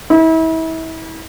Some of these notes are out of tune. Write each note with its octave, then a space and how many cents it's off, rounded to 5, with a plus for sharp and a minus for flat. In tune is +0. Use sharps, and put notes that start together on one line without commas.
E4 -35